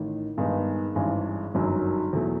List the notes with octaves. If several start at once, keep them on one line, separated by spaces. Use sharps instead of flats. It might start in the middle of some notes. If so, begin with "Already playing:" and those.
Already playing: A1 D#3
G2 D#3 G#3 B3 D#4
G#1 G2 E3 G#3 C#4
G1 F#2 D#3 F#3
E2 B2 F#3 A3